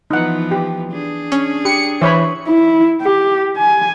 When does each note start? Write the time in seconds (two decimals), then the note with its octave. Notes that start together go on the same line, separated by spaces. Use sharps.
0.11 E3 F3 B3 D#4 F#5
0.51 G4
0.92 D4 G#4
1.32 C#4
1.65 G4 C#7
2.01 E3 C5 C#5 B5
2.48 E4
3.01 G4
3.57 G#5